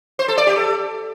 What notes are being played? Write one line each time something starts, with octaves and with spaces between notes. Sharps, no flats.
C5
A4
D5
G4
A4